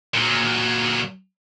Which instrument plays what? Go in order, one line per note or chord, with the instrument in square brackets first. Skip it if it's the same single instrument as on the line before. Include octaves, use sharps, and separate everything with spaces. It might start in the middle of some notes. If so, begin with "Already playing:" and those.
[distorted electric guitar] A#2 F#3